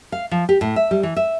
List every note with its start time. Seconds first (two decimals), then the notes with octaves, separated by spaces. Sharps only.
0.12 F5
0.31 F3
0.49 G4
0.61 A2
0.76 E5
0.91 G3
1.03 E3
1.16 E5